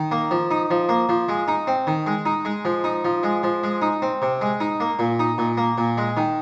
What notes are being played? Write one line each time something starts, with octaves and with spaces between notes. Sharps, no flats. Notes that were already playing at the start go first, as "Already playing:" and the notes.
Already playing: D#3
A#3
F3
D#4
F3
A#3
F3
G#3
D#4
C4
D#3
G#3
D#4
G#3
F3
D#4
F3
G#3
F3
G#3
D#4
C4
C3
G#3
D#4
A#3
A#2
D#4
A#2
A#3
A#2
G#3
D#3